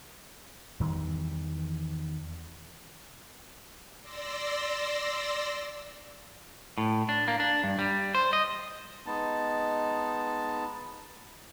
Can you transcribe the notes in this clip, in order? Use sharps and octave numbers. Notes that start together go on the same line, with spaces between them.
E2 D#3 E3 G3
D5 C6 E6 A#6
A2
D4
A#3
D4
G2
G3
C5
D#5
G#3 B3 D#4 A5